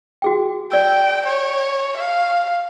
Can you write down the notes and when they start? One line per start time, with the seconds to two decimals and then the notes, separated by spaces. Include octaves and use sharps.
0.22 F#4 G#4 G5
0.72 D5 G5 E6
1.26 C#5
1.97 F5